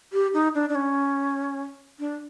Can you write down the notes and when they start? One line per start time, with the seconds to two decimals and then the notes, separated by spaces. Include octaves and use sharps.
0.13 G4
0.34 D#4
0.55 D4
0.69 D4
0.75 C#4
1.99 D4